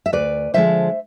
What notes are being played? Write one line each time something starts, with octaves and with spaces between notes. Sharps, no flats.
E5
D2 B4 D5
D3 F3 G#3 C5 E5